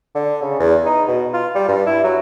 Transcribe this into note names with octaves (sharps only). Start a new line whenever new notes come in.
D3
C#3
E2
D#4
B2
F4
G3
G2
E4
F#3